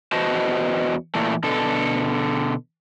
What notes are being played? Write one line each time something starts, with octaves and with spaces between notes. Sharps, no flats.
E2 F#4 B4 C5 D#5 A5
A#2 E3 A3
B2 D3 A4